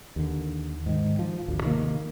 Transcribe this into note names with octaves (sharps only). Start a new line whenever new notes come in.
D#2 D3
G#2 D#3
F3
G#1 D2
C3 D#3 F#3 A#3